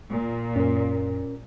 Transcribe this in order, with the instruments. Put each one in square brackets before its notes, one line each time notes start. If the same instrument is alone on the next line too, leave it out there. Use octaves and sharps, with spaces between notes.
[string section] A#2
[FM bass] F#2 [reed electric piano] C#4 A#4